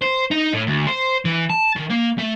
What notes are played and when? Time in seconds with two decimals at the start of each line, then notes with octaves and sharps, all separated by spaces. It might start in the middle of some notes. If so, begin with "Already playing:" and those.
0.02 C5
0.31 D#4
0.53 A2
0.67 D2
0.87 C5
1.25 E3
1.50 A5
1.76 D#3
1.90 A#3
2.19 A3